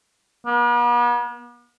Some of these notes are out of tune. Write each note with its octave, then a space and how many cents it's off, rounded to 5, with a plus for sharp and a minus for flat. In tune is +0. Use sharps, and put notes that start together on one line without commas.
B3 -45